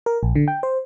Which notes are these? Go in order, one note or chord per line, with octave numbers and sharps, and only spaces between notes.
A#4
A#1
D3
G5
C5